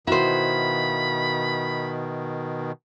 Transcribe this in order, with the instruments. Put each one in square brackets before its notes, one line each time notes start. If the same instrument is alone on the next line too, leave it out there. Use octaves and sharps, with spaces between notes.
[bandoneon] B2 D#3 [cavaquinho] E4 C5 [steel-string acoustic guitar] F#4 F5 [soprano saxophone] B5